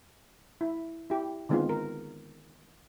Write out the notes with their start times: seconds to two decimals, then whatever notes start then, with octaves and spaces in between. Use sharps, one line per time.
0.61 E4
1.10 E4 G4
1.49 D3 D#3 G#3 B3 C4 F4
1.69 A#4